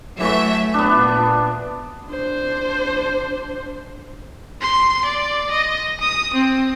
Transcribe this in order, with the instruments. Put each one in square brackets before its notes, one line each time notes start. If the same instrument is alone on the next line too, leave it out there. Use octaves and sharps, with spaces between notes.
[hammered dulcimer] E3 C#6 [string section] F#3 A3 E5
[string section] A#2 [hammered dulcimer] B3 D4
[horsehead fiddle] D4 C5
[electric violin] C6
D5
D#5
D#6
C4